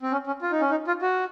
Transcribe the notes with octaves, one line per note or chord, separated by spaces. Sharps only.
C4
C#4
C#4
F4
D#4
C#4
D#4
F4
F#4